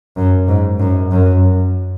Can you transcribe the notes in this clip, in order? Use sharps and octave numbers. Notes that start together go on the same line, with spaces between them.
F#2
G#2
F#2
F#2